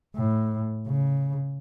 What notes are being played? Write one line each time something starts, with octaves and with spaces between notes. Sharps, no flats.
A2
C#3